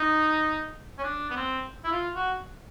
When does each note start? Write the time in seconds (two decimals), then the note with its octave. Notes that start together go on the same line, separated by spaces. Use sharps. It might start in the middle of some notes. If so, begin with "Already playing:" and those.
Already playing: D#4
0.99 C#4
1.04 D4
1.30 B3
1.37 C4
1.84 E4
1.92 F4
2.15 F#4